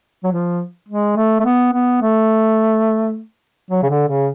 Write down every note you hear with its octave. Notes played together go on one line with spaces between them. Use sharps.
F#3
F3
G#3
A3
A3
B3
B3
A3
F#3
C#3
D3
C#3